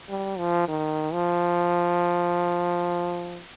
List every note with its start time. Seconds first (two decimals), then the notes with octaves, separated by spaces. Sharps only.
0.09 G3
0.38 F3
0.68 D#3
1.13 F3